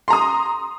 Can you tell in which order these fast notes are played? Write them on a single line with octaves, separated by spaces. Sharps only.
C6 A#5 D#6